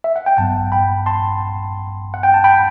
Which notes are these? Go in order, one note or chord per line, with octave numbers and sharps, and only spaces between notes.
E5
F#5
G5
A1 G2 F#3 B3 F#5 A5
G5 B5
A5 C6
F#5
G5
A5
G5 B5